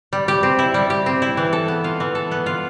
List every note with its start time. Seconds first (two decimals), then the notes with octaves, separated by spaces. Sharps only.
0.13 G3
0.28 G4
0.43 C4
0.59 E4
0.74 G3
0.90 G4
1.06 C4
1.22 E4
1.37 E3
1.53 A4
1.68 B3
1.84 F4
2.00 E3
2.15 A4
2.31 B3
2.46 F4